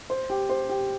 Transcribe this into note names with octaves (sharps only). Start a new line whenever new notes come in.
C5
G4
C5
G4